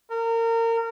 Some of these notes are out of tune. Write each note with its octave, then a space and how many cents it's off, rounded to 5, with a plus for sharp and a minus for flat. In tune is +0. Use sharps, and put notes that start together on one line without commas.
A#4 -30